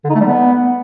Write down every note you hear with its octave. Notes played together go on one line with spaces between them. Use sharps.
D3
D#4
A3
G3
B3